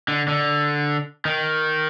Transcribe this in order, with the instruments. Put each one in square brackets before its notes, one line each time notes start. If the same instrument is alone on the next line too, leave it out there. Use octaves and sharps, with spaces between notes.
[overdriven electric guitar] D3
D3
D#3